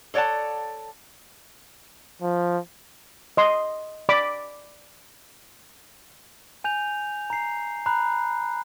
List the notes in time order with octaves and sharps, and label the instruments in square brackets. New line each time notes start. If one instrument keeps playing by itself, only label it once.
[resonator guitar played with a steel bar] A4 C#5 D5 F#5 A5
[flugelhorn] F3
[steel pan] D#5 C6
D5 B5 D6
[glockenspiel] G#5 G6 F7
A#5 C7
A#5 B5 F#6